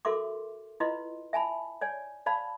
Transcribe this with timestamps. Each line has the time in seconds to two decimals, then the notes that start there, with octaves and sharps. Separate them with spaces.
0.05 F#4 A4 A#4 E5 C6 D6
0.80 E4 F4 B4 D#5 C6
1.33 E5 G#5 A5 B5
1.81 C#5 D5 G#5
2.26 C5 D5 F5 A5 B5